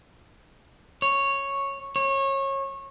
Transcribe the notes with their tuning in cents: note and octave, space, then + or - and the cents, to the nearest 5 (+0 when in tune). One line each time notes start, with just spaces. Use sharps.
C#5 -5
C#5 -25